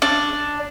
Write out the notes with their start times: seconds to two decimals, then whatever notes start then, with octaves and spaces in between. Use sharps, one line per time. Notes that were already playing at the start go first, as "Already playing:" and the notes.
0.02 D4